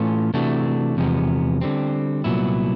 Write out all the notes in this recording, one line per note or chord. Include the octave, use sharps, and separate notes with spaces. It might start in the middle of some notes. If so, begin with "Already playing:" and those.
Already playing: A2 E3 A3 C#4 F4
C3 E3 A3 D4 F#4
E2 C3 F3 G#3 B3
D3 G3 C4
C2 A#2 F#3 B3 E4